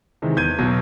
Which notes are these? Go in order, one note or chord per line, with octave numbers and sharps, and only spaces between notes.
C3 D#3 E3 G#3
E2 G6 G#6 D#7
B1 B2 F#3